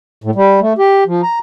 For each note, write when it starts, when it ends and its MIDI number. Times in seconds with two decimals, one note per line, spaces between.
0.24 0.31 45
0.35 0.60 55
0.61 0.73 57
0.78 1.04 67
1.07 1.21 53
1.23 1.39 82